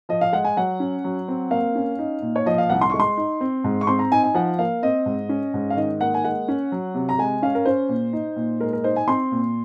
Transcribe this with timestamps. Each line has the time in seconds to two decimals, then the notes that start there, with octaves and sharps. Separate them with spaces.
0.09 F3 D#5
0.21 F5
0.33 G#3 F#5
0.44 G#5
0.57 F#3 F#5
0.80 C#4
1.04 F#3
1.28 C4
1.51 A#3 F5
1.75 C#4
1.99 D#4
2.22 A#2
2.36 C#5
2.46 F3 D#5
2.58 F5
2.70 C2 F#5
2.81 C6
2.90 C#6
2.94 G#3
3.00 C6
3.17 D#4
3.41 C4
3.64 G#2
3.81 C#6
3.87 C4 C6
3.99 A#5
4.12 D#4 G#5
4.24 G#5
4.34 F3 F#5
4.59 A#3 F5
4.83 C4 D#5
5.06 G#2
5.29 C#4
5.54 G#2
5.70 F5
5.77 D#3 D#5
6.01 A#3 F#5
6.14 G#5
6.24 G#3 F#5
6.48 C#4
6.72 F#3
6.94 C3
7.09 A#5
7.19 G#3 G#5
7.42 C#4 F5
7.55 A#4
7.65 C#4 C5
7.89 A#2
8.13 D#4
8.36 A#2
8.60 G#3 A#4
8.73 A#4
8.84 D#4 C5
8.96 G#5
9.08 C4 C6
9.32 A#2